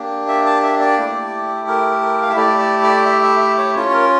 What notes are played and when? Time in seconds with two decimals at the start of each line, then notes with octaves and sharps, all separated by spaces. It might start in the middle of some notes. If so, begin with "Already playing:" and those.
Already playing: A#3 D4 G4
0.28 E5
0.46 A5
0.63 E5
0.80 D5
0.98 A3 E4 G4
1.68 A#4
2.01 A#4
2.22 F5
2.30 E5
2.36 A3 E4 G4 D5
2.59 D5
2.83 D5
3.06 E5
3.24 E5
3.41 E5
3.58 C#5
3.75 C#4 F4 C#5
3.88 C#5
3.93 A#4